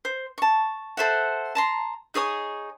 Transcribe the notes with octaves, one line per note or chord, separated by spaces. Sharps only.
C5
A5 C#6
A4 C5 E5 F#5
A5 A#5 C6
D#4 G#4 C#5 D#6